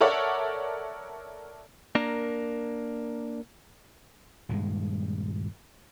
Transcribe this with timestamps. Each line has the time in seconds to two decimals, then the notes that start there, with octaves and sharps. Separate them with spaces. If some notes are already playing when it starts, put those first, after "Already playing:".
0.01 A4 A#4 C#5 D5 E5 F#5
1.95 A#3 D4 A#4
4.49 D#1 G2 G#3